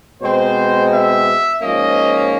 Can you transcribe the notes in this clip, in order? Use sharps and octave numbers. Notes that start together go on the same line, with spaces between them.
B2 G#3 C4 C5
E5
G#2 F3 A#3 C#4 D#5